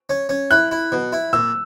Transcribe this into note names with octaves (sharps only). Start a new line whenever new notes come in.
C#4
C#4
E4 F#6
E4
B2
E4
A#2 E6